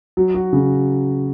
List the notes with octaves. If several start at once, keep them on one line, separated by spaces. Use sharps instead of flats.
F#3
F#4
C#3